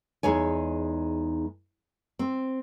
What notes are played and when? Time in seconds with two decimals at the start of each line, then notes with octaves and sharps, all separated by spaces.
0.23 E2 G#3 D#4 C#5 G#5
2.19 C4